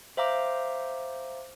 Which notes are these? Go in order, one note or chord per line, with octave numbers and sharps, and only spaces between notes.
C5 E5 F5 A#5 D6